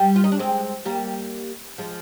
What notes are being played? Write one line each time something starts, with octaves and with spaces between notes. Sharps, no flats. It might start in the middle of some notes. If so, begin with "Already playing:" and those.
Already playing: G3
F4
D#4
D4
G#3 C4
G3 A#3
F3 G#3